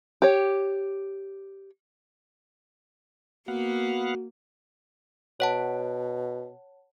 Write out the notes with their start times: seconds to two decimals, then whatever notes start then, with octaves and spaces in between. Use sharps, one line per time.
0.22 G4 C#5
3.48 A#3 B3 F#4 F5 F#5
5.40 B2 C#5 F#5 A5